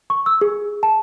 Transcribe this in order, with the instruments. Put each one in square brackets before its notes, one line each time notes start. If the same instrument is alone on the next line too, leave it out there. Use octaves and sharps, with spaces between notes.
[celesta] C#6
E6
G#4
A5